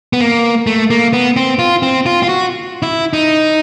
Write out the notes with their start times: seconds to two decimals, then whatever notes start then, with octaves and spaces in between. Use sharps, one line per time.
0.13 B3
0.21 A#3
0.67 A3
0.90 A#3
1.13 B3
1.36 C4
1.59 F4
1.82 C4
2.06 F4
2.23 F4
2.29 F#4
2.83 E4
3.13 D#4